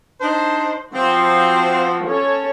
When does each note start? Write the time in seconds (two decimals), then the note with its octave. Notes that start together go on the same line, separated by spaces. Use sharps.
0.21 D4 D#4 C5
0.94 F3 C4 F#4 C5
2.08 C#4 A4 C#5